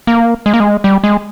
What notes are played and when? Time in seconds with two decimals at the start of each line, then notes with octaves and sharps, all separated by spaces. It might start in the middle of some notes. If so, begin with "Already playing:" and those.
0.07 A#3
0.46 G#3
0.54 A#3
0.60 G#3
0.84 G3
1.04 G#3